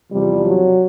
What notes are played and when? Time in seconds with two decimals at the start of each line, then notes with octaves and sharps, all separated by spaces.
0.11 E2 C3 F3 G3
0.46 F#3